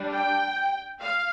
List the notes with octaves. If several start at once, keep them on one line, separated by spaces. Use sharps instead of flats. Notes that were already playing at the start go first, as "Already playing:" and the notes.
Already playing: G3 D4
G5
F5